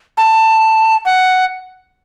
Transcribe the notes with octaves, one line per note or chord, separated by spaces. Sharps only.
A5
F#5